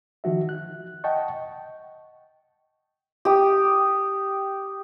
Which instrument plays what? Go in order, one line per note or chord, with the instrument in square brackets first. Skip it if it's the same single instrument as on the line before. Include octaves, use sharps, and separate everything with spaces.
[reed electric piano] D#3 F3 F#4 E5
F#6
D#5 F#5 G5 A5 C#6
[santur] G4 D#6